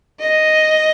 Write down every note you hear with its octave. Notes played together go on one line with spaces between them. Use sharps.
D#5